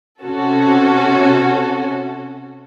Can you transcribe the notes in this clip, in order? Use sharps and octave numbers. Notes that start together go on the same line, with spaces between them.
C3 C#4 F#4 A4